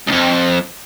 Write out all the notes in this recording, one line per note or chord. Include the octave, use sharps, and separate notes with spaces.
C2 F2